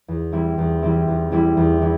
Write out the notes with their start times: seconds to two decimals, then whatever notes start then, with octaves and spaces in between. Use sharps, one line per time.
0.08 E2
0.32 E3 G3 C4 E4
0.58 E2
0.82 E3 G3 C4 E4
1.08 E2
1.32 E3 G3 C4 E4
1.57 E2
1.82 E3 E4